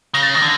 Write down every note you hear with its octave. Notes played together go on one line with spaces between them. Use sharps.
C#3 A#6
A6
D#3 A#6
D3